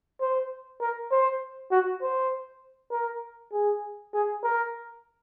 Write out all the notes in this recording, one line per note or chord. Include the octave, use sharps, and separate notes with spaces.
C5
A#4
C5
F#4
C5
A#4
G#4
G#4
A#4